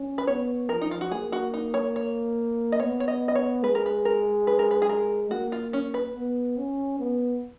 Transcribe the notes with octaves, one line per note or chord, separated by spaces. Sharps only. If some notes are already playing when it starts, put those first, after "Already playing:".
Already playing: C#4
B4
B3 C#5
F3 A#4
D#4
F4
F#4
A#3 G#4
F#4
D#4
C#5
C#5
D#5
B3 C#5
C#5
D#5
D#5
C#5
G#3 B4
A#4
B4
A#4
B4
A#4
B4
G#4
A#4
A#3 F#4
F4
C#4
B4
B3
C#4
B3